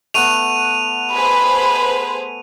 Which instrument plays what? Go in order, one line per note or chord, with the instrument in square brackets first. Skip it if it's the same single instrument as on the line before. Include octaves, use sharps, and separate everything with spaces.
[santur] A3 B3 F#5 [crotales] D#7 F7
[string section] G#4 B4 C5 [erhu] B5